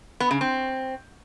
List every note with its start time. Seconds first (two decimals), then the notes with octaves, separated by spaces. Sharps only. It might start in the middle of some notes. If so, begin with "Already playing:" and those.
0.20 B3
0.31 C#3
0.41 C4